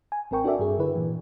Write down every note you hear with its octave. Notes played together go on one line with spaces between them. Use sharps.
G#5
A1 C4 A#4 G5 C#6
D4 F#4 A4 A#4 D5 E5
G2 G#4
D3 E4 B4
A#2 E3